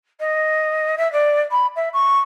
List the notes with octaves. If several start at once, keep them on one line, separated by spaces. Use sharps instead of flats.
D#5
E5
D5
B5
E5
C#6